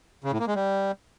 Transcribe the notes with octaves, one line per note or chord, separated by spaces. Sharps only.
C#3
A2
A#3
G#3
G3